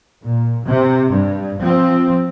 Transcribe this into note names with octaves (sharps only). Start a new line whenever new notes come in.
A#2
C3
G2
F3 C4